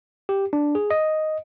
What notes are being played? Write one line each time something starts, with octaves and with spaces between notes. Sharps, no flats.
G4
D4
G#4
D#5